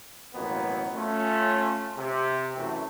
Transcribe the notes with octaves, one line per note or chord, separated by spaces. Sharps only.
A1 F2 B2 F#3 A#3 B3
A3 C#4 F4
C3
F#2 E3 A3